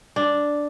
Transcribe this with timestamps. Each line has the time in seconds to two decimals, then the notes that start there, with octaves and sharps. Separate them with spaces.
0.16 D4